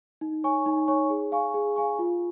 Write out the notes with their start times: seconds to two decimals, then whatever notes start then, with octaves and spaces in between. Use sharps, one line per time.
0.21 D#4
0.44 C#5 G#5 C#6
0.66 D#4
0.88 C#5 G#5 C#6
1.10 G#4
1.32 F5 G#5 C#6
1.54 G#4
1.76 F5 G#5 C#6
1.99 F4